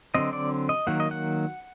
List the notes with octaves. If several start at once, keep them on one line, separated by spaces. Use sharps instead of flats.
D3 F#3 C4 D#5
D5
D#5
D#3 F#3 A#3 F#5
D#5
F#5